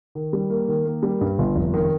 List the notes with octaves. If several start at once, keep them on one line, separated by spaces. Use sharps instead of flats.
D#3
G3
A#3
D#3
A#3
G3
G2
G1
F1
D#3